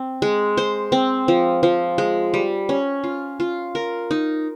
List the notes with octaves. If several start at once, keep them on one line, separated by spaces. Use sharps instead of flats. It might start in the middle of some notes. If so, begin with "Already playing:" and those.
Already playing: C4
G#3
C5
C4
F3
F3
G#3
G3
C#4
F4
F4
A#4
D#4